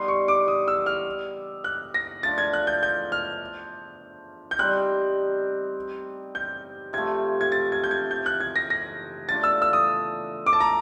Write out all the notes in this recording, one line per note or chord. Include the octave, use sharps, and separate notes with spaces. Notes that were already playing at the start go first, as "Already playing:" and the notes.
Already playing: G3 B3 D#4 G4 C6
C#6
D6
D#6
E6
F6
F#6
A#6
F3 A3 D4 A6
G#6
F#6
G6
G6
F6
G6
G3 C4 D#4 F#6
G6
C3 F3 A3 G#6
G#6
A6
G#6
G6
G#6
G6
F#6
G#6
A#6
A#6
A3 D4 F4 A4 A6
E6
E6
D#6
D6
A5
A#5